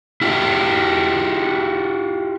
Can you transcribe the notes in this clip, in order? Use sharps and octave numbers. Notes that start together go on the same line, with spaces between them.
E4 F4 G4 C5 E5